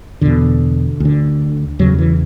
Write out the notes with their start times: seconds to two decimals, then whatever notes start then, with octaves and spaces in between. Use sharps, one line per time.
0.21 E2 B2 D3
1.00 D2 D3
1.79 E2 C#3 F#3
1.98 E3